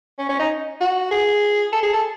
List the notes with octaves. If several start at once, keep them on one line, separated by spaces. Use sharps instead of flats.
C#4
C#4
D#4
F#4
G#4
A4
G#4
A4